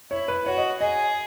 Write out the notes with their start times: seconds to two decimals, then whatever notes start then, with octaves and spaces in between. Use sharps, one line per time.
0.11 E4 C#5
0.28 B4
0.46 F#4 C#5
0.58 D#5
0.80 G#4 D#5